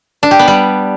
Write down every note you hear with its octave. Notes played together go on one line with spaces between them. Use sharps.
D4
G4
B3
G3